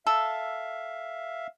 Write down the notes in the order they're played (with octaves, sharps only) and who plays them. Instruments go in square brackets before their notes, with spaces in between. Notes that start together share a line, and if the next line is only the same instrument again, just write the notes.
[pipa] A4 [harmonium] E5 F5